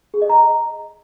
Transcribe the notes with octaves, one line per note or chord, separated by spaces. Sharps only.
G#4
D#5
A#5